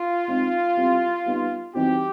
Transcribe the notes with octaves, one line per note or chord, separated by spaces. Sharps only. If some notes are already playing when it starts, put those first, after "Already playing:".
Already playing: F4
G#3 C4 D#4
G3 C4 E4 G4
G3 B3 D#4
E3 G3 C4 D#4 F#4 G4